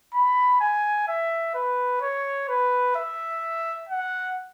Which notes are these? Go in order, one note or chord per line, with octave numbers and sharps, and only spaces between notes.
B5
G#5
E5
B4
C#5
B4
E5
F#5